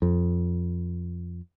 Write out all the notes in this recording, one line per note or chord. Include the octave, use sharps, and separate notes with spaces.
F2